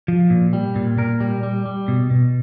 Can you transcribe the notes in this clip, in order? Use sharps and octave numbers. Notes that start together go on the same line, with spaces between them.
F3
A#2
G3
A#2
A#2 A#4
G3
G3
G3
B2
B2